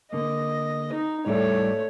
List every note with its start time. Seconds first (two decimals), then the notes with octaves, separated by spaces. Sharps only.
0.13 D3 A#3 D#5
0.93 D#4
1.26 A2 G3 A3 C#5 D5